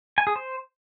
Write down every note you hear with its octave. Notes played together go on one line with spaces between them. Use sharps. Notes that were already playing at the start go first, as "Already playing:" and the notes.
G#5
G#4
C5